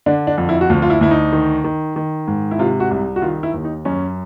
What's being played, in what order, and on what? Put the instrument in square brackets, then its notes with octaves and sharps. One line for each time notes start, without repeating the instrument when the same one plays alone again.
[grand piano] D3 D4
D4
F2
E4
F#4
D2 F4
F4
E4
D2 E4
D#4
D#3
D#3
D#3
G#2
E4
C3 F4
F#4
C2
F#4
D#3 F4
E4
D#2
D#4
F#2 C#4